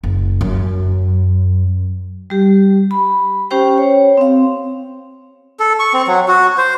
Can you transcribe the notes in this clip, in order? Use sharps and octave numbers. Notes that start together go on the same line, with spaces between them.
F#1
F#2
G3 G4
B5
C#4 G4 C5 G5
C#5
C4 F5
A4
C#6
C4
F#3
F#4
C5